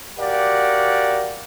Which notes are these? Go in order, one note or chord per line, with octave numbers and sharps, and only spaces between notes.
F#4 G4 A#4 D5 F5 F#5